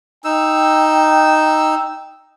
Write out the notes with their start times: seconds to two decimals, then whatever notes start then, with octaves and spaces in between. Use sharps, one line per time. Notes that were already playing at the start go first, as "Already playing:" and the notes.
0.24 D#4 G5 E6